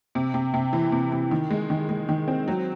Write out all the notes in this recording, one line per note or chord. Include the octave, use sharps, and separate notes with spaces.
C3
C3
C3
E3
C3
C3
D#3
G#3
D#3
G#3
D#3
C4
F#3